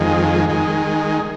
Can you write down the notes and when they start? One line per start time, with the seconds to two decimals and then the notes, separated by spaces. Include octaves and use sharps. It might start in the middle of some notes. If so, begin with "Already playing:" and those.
Already playing: F2 D#3 G#3
0.49 D#3 G#3